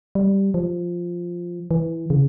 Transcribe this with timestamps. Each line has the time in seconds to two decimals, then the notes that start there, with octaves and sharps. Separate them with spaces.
0.15 G3
0.54 F3
1.71 E3
2.10 C#3